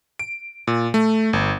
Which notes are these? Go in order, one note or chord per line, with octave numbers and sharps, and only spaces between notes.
D7
A#2
A3
G1